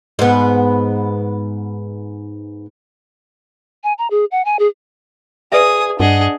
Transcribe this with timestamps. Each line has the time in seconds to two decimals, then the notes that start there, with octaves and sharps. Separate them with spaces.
0.19 G#2 B3
3.84 G#5
3.98 A#5
4.10 G#4
4.31 F#5
4.45 G#5
4.59 G#4
5.52 G#4 B4 D5 E5 D#6
6.00 G2 D4 G#4 D#5 F#5